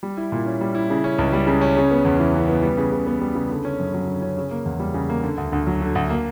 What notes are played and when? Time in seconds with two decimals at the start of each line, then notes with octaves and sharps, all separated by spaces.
0.03 G3
0.17 E4
0.32 A#2
0.46 C#4
0.61 G3
0.75 E4
0.90 C#3
1.04 C#4
1.18 C#2
1.33 G3
1.47 C#3
1.61 C#4
1.77 C#3
1.91 B3
2.05 E2
2.20 E3
2.34 C#3
2.48 B3
2.63 G3
2.77 C#3
2.92 C#3
3.07 B3
3.21 G3
3.35 C#3
3.50 D3
3.65 C#4
3.79 F#2
3.93 F#3
4.07 D3
4.22 C#4
4.37 C#3
4.51 A#3
4.66 E2
4.79 G3
4.94 C#3
5.09 A#3
5.23 D3
5.37 D2
5.52 D2
5.67 F#3
5.81 D3
5.95 D2
6.10 A#3